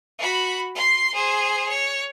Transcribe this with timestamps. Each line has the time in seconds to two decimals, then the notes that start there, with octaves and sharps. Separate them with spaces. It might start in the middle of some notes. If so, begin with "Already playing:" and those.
0.19 F#4 B5
0.75 C6 C7
1.14 G#4 C5
1.68 C#5